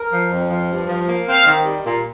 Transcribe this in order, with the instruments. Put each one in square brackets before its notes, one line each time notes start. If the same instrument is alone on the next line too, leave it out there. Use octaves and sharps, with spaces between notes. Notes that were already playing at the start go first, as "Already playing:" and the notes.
Already playing: [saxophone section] A#4
F3
F2
F3
G2
F3
A#3
[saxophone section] C4 [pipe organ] F5
[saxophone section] D#3
G3
A#2